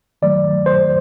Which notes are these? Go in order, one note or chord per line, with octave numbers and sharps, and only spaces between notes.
D#3 F#3 A3 D5
C5